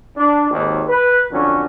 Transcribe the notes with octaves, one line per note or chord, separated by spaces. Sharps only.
D4
G#1 D#2
B4
F2 D3 F#3 C#4